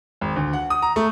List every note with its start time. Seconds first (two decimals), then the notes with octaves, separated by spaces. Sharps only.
0.21 G#1
0.36 D2
0.53 F#5
0.70 D#6
0.82 A#5
0.96 A3